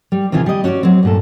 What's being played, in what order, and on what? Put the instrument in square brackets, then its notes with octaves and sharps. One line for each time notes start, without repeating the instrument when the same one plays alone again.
[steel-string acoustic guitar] G3
C3 D#3 E3 F4 G#4
G3 D#5
C#4 F#4 C#5 D5
F#3 C4
G2 A#2 A4